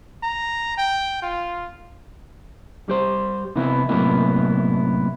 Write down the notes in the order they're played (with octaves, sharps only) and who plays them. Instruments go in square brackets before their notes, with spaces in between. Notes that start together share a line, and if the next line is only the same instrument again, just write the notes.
[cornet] A#5
G5
F4
[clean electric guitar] G3 G4 C5
C3 E3 B3 E4
F#2 A2 C3 A#3 B3 E4